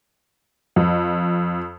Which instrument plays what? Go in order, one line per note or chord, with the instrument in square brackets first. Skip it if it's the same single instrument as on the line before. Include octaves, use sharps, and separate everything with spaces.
[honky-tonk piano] F2